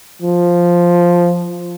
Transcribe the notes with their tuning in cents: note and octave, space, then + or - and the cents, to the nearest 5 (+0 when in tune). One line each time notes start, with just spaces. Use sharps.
F3 +0